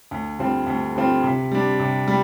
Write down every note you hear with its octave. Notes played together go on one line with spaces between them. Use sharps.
D2
D3 G3 C4 F4
D2
D3 G3 C4 F4
C3
G3 D4
C3
G3